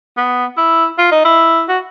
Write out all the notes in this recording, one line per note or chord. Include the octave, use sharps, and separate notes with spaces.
B3
E4
F4
D#4
E4
F#4